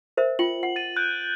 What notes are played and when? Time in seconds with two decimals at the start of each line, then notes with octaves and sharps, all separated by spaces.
0.17 A#4 C5 E5
0.39 F4 G5 F#7
0.63 F#5
0.76 A6 D#7
0.96 F#6 G6 D7